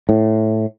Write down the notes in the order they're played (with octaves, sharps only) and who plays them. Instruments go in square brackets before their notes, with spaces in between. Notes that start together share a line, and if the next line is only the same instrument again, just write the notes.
[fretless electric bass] A2